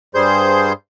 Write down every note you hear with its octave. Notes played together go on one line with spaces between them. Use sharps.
G2 G3 G#4 C5 C6 G6